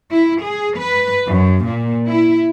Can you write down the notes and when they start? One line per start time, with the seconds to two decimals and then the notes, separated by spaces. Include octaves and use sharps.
0.12 E4
0.42 G#4
0.79 B4
1.27 F#2
1.66 A#2
2.07 E4